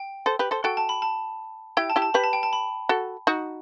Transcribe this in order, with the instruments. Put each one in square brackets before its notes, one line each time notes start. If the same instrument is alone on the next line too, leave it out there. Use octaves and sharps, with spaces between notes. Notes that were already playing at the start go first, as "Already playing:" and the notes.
Already playing: [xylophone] G5
[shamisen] A4 C5
G4 B4
A4 C5
[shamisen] F#4 A4 [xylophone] G5
[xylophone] A5
B5
A5
[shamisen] E4 G4 [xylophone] G5
[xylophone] A5
[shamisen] E4 G4
[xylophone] A5
[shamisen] G4 B4 [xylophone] B5
[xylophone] A5
G5
A5
B5
[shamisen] F#4 A4
D#4 F#4